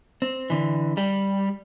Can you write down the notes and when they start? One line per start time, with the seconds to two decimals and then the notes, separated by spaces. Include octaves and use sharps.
0.22 C4
0.50 D3 E3
0.97 G3 G4